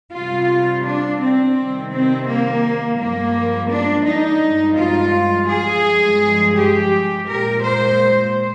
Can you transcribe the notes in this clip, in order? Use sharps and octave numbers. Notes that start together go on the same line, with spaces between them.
C3 G3 F4
D4
C4
C3 D#3 G3
C4
A#3
G2 F3 G#3 A#3
D4
D#4
G2 F3 G#3
F4
G#4
G2 F3 G#3
G4
A#2 G#3 A#4
C5